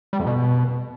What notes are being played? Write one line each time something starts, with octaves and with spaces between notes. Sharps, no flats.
G3
F2
B2